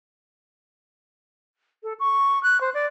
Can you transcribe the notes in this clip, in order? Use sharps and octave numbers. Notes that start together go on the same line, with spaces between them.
A4
C#6
F#6
C5
D5